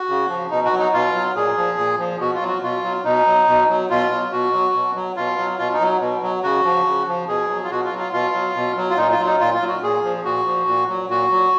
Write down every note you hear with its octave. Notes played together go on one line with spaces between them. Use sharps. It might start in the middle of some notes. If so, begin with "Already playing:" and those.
Already playing: F#4
C#3
F3
B2 D#4
F#4
F#3
D#4
B2 F4
F#3
A#2 G#4
F3
A#2
F3
B2 F#4
F4
F#3
F#4
B2 F4
F#3
B2 D#4
F#3
B2
F#3
B2 F4
F#3
B2 F#4
F#3
B2
F#3
B2 F4
F#3
B2 F4
D#4
F#3
B2
F#3
C#3 F#4
F3
C#3
F3
B2 G#4
F#3
F4
B2 F#4
F4
F#3
F4
B2 F4
F#3
B2
F#3
F4
A#2 D#4
F4
F#3
D#4
A#2 F4
F4
F#3
F#4
A#2 G#4
F3
A#2 F#4
F3
A#2
F#3
A#2 F#4
F#3